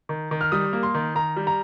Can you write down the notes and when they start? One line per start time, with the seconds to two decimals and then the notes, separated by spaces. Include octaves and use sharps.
0.09 D#3
0.31 D#3
0.41 F6
0.52 G3 D#6
0.73 A#3
0.83 C6
0.94 D#3
1.15 D#3 A#5
1.36 G3
1.47 A#5